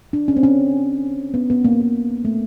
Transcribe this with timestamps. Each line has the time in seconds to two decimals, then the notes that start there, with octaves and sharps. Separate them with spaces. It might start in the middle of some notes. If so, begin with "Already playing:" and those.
0.13 D4
0.28 C#4
0.36 C4
0.43 C#4
1.34 B3
1.50 B3
1.64 A#3
1.72 B3
1.81 A#3
2.25 A3